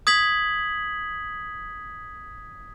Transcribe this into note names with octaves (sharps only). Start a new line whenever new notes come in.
D#6 G#6 B6 F#7